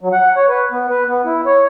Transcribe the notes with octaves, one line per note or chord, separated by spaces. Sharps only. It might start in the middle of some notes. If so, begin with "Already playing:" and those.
F#3
F#5
C#5
B4
B3
B4
B3
E4
C#5